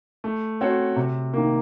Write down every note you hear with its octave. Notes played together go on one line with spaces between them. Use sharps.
A3
C4 F#4 A4 C#5
C3
D#3 A#3